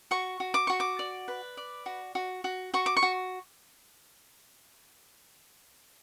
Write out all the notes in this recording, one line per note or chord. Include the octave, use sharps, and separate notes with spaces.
F#4 C#6
F#4
D6
F#4 C#6
D6
D5
B4
D5
F#4
F#4
F#4
F#4 C#6
D6
C#6
F#4